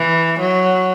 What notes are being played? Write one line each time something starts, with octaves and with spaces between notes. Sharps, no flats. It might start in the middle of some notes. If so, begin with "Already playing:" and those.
Already playing: E3
F#3